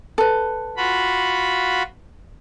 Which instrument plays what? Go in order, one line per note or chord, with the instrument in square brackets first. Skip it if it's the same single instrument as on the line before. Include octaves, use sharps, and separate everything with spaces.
[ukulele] A4 B4
[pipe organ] F4 F#4 B5